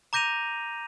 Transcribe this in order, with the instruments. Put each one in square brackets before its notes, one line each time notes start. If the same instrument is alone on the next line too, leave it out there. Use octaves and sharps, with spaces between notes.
[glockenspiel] A#5 D6 G6 A#6 D#7 F7